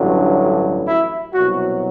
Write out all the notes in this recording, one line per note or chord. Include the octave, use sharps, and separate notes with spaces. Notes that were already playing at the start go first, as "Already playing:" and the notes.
Already playing: A1 G2 D3 F#3
E4
C2 B2 F#3 F#4